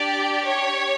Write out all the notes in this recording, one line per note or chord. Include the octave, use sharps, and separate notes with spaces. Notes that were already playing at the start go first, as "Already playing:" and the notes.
Already playing: D4 G4 D5
C#5